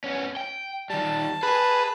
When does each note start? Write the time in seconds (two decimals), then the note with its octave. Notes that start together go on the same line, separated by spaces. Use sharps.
0.04 B3 C#4
0.37 G5
0.90 D#3 G3 A5
1.43 G#4 B4